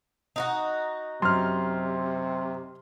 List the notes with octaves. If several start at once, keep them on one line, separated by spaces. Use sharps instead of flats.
D#4 F4 F#4
F#2 C3 C6 F6